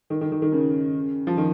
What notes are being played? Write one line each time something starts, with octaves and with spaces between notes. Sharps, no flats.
D#3
D#3
D#3
D#3
C#3
F3
D#3